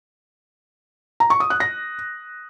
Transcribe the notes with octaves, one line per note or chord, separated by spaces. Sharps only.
A#5
C#6
D#6
F#6
A#6